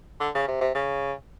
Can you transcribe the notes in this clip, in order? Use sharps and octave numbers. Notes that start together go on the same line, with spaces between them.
D3
C#3
C3
C3
C#3